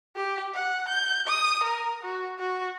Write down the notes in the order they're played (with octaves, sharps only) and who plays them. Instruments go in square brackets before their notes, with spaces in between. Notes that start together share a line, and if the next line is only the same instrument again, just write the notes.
[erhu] G4
F#5
G6
D#6
A#4
F#4
F#4